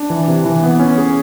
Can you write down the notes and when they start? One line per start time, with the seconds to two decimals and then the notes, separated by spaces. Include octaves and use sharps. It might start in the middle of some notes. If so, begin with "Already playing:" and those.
Already playing: D4
0.10 E3
0.28 C3
0.46 E3
0.63 B3
0.80 C#4
0.98 G#4